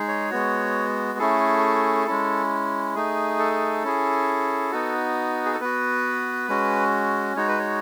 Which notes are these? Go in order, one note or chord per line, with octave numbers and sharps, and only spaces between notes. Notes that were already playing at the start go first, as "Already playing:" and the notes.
Already playing: G#3 D#4 G#4
C#5
G#3 B3 F#4
A3 C#4 E4 G#4 A4
G#3 C#4 E4
A3 D#4 G#4
A4
C#4 E4 G#4
B3 D#4 F#4
G#4
A4
B3 F#4 B4
G#3 C#4 F#4
G#3 D#4 F#4 C#5
B4
C#5